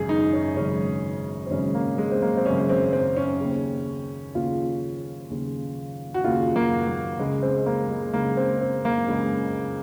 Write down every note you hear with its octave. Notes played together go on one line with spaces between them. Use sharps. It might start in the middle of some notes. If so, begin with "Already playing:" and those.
Already playing: G#1 F#2 C#3 G#4
D#4
C#4
G#1 F#2 C#3 C#4
C4
G#1 F#2 C#3 C#4
A#3
G#3
C4
A#3
C4
G#1 F#2 C#3 C#4
C4
C4
C#4
D#2 C#3
D#2 C#3 F4
D#2 C#3
F#4
D#2 C#3 F4
A#3
A#3
C#2 C#3 G#3
C4
A#3
G#3
C#2 C#3 A#3
C4
C4
A#3
C#2 C#3